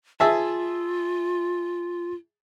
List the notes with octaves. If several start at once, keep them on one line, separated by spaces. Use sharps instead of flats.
F4 G#4 E5 A5